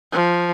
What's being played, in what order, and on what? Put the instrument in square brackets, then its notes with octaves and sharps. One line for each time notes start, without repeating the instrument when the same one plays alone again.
[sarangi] F3